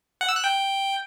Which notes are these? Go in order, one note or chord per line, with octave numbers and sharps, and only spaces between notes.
F#5
E6
F#6
G5